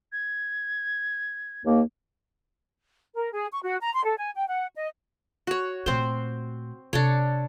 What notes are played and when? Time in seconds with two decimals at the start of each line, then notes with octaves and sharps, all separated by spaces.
0.12 G#6
1.64 D#2 A#3
3.16 A#4
3.33 G#4
3.52 C#6
3.63 F#4
3.81 A#5
3.93 C6
4.05 A4
4.18 G#5
4.36 G5
4.49 F#5
4.75 D#5
5.47 F#4 C#5
5.86 A#2 A3 C4 C5
6.93 C3 D4 A4 C#5